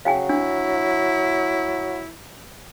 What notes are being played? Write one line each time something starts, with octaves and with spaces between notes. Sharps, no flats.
C#3 F#3 F5 G5 G#5
D4 E4